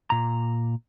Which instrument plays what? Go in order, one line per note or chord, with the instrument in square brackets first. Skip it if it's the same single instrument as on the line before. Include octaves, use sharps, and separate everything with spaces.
[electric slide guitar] A#2 A#5